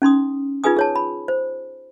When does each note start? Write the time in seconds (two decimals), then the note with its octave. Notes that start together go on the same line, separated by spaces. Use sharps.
0.02 C#4 D#4 C6 D#6
0.64 D#4 F4 G#4 B4 G#5 D#6
0.76 G#4 C#5 A5
0.96 B5
1.28 C5